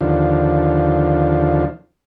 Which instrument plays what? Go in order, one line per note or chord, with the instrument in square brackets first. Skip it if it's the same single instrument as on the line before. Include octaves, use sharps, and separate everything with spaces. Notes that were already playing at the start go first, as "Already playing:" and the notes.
[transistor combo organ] D#2 D3 F3